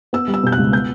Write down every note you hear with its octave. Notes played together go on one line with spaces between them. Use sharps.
B3 E6
G3
E6
B2 G6
F#6
C#2
B3 G6